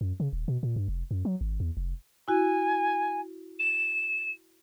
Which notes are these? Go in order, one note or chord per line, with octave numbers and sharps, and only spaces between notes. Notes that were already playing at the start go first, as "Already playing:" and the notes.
F#2
C#3
D#1
B2
A#2
G2
F1
F#2
F#3
G#1
E2
F1
E4 F#4 G#5
E7